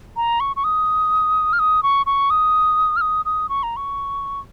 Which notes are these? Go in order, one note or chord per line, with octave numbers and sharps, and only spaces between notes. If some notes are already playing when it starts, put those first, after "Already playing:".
A#5
C#6
C#6
D#6
F6
D#6
C#6
C#6
D#6
F6
D#6
D#6
C#6
A#5
C#6